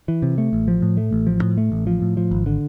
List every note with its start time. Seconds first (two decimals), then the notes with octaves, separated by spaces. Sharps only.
0.08 E3
0.22 C3
0.38 A3
0.53 A1
0.68 F3
0.82 A2
0.97 A3
1.13 A1
1.27 F3
1.42 A2
1.57 A3
1.72 A1
1.87 F3
2.02 A2
2.17 F3
2.31 G#1
2.46 D3